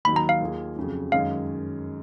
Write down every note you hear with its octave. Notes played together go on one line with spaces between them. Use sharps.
D#2 D#3 F#3 B5
A#5
F5
D#2 D#3 A#3 F4 G#4
F2 C#3 F#3
F#2 D#3 G#3 C#4 F5